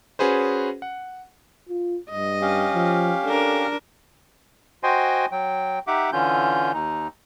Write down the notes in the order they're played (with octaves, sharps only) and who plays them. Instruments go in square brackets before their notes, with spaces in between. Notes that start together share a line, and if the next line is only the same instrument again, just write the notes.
[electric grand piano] C#4 F#4 G#4 B4 C5
F#5
[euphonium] F4
[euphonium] G2 [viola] D#5
[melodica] C#4 G4 F5
[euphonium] F3
[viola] D4 A#4 [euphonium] A4
[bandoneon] F#4 C5 D#5 G5 G#5 C6
F#3 G5
D#4 G4 E5 F#5 D6
D3 E3 C#4 F4 G6
D#2 D#4